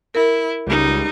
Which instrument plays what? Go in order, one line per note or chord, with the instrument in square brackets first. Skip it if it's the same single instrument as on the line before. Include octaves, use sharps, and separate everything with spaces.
[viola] E4 [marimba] A#4
[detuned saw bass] C#2 [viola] G3 D#4